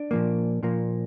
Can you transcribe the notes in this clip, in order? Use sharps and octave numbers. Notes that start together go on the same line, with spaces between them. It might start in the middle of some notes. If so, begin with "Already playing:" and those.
Already playing: D4
A#2 F3 A#3
A#2 F3 A#3